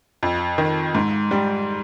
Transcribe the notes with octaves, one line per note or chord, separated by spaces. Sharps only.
F2
D#3
G#2
G3